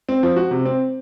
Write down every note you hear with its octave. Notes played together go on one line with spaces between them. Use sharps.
C4
F3
F#4
C3
C4